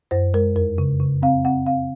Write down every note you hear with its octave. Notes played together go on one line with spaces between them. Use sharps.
F#2 C5
G#3 A#4
F2 A#4
C#3
C#3
C4 F5
C4 F#5
C4 F5